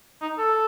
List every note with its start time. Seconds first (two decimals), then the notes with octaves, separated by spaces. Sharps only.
0.21 D#4
0.38 A4